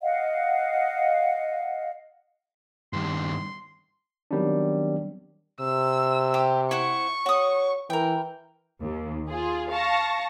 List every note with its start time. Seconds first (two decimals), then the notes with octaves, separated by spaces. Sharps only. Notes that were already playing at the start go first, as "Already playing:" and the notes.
0.02 D#5 F5 F#5
2.93 G2 D#3 C6
4.31 D#3 F#3 G3 B3 C4 D4
5.61 C3 E6
6.34 G4
6.71 E4 C5 F#5 C#6
7.26 F#4 C#5 D#6
7.90 E3 A#4 G5
8.81 D#2
9.29 F4 G#4
9.71 F5 A5 C#6 A#6